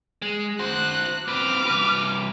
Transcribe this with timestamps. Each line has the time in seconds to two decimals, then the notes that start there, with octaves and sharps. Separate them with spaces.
0.22 G#3
0.59 F#4 C5 F#6
1.28 C4 B4 D6 F6
1.66 C2 B4